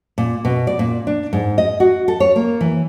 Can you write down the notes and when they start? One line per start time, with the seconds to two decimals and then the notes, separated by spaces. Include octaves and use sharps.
0.18 A#2
0.45 B2
0.67 D5
0.79 A#2
1.07 D4
1.33 G#2
1.58 D#5
1.80 F#4
2.08 A4
2.20 C#5
2.36 A#3
2.61 E3